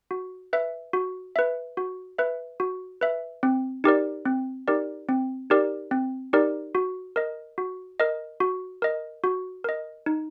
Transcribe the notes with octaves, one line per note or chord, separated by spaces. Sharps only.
F#4
B4 E5
F#4
B4 E5
F#4
B4 E5
F#4
B4 E5
C4
D#4 G4 A#4 D5
C4
D#4 G4 A#4 D5
C4
D#4 G4 A#4 D5
C4
D#4 G4 A#4 D5
F#4
A#4 D#5
F#4
A#4 D#5
F#4
A#4 D#5
F#4
A#4 D#5
D#4